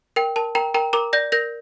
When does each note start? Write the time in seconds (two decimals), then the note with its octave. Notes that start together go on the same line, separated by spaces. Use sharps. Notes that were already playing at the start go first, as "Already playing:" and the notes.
0.16 A#4 G5
0.36 A#4 A5
0.55 A#4 G5 A#5
0.74 A#4 G5 A#5
0.93 A#4 A#5 D6
1.13 D5 G6 A#6
1.32 A#4 G6 A#6